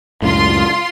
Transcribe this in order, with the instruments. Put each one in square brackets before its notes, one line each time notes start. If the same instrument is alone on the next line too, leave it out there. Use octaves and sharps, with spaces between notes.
[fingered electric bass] C#2 F#2 A2 [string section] F4 C6